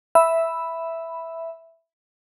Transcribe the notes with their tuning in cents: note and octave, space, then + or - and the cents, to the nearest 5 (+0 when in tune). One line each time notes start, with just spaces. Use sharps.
E5 +0 B5 +0